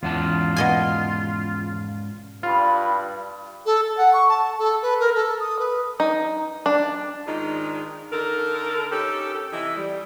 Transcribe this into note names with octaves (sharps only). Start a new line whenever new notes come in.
E2 G#2 C#4 F4 A5
B2 D#5 G#5
G2 F4 B5
A4
A4
F#5
C#6
A5
A4
B4
A#4
A4
D#6
B4
D#4
D4
G#2 D#3 G#3 D4 D#4 F4
D3 D#4 A4 A#4
C#4 D#4 G4 A4
C3 E3 D#5 E5
G3